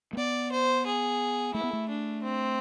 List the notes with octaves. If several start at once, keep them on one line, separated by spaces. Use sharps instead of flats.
A3
B3 D5
C5
G#4
A3 E4
B3
A3
D4
C4